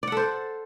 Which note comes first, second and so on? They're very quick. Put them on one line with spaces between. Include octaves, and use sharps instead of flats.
D5 F#5 A4 C5